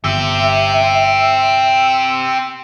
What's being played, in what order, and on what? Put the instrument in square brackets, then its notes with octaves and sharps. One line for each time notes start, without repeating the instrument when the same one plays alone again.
[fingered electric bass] G1 [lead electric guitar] C4 G4 [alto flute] E5 [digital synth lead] E6